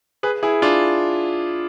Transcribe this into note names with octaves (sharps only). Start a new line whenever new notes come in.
G#4 B4
E4 G#4
D4 F4